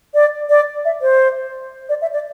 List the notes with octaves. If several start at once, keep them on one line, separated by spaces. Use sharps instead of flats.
D5
D5
E5
C5
D5
E5
D5